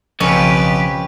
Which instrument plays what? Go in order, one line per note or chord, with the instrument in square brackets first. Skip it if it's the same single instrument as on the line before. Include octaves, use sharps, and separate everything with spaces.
[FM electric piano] B1 C#3 [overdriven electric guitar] F2 [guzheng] C#4 [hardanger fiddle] G4 B4